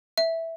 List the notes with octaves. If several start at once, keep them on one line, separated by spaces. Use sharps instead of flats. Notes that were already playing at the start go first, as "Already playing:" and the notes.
E5